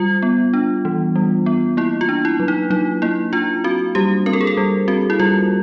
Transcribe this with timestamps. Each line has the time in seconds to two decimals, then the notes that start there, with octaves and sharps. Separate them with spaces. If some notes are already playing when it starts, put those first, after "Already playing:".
Already playing: G3 F4
0.23 B3
0.54 D4
0.85 E3
1.16 G3
1.46 B3
1.77 A#3 E4
2.01 F4
2.09 D4
2.25 E4
2.40 F#3
2.48 D#4
2.70 F#3 D#4
3.02 A#3 E4
3.33 D4 F4
3.64 C4 F#4
3.95 G3 G4
4.26 C4 A#4
4.33 A4
4.41 G#4
4.47 A4
4.57 G3
4.88 C4 F#4
5.10 E4
5.20 G3 F4